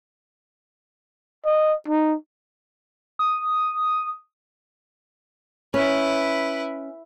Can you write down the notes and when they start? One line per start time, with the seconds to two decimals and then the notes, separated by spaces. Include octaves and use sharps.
1.45 D#5
1.88 D#4
3.19 D#6
5.74 C#4 E4 B4